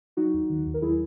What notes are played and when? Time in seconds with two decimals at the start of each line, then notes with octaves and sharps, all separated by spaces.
0.17 F#3 D#4 F#4
0.34 D#2
0.50 D#3
0.67 D#2
0.74 A#4
0.82 F#3 E4 G#4